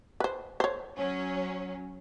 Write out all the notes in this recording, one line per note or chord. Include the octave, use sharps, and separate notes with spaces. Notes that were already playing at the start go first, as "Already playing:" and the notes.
B4 C5
C5 C#5
F#3 C#4